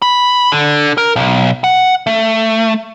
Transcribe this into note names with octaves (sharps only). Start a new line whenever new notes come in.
B5
D3
A#4
B1
F#5
A3